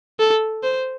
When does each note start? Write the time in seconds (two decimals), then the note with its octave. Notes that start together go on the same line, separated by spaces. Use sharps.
0.19 A4
0.63 C5